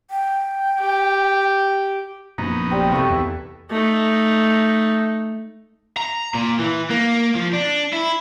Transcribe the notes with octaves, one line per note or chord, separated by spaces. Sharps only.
G5
G4
A#1 F#2 B3 D#4 A#5
G3 C4
C3 A4 F5 C#6
E2 E3
A3 D#4
A#5
A#2
E3
A#3
F3
D4
E4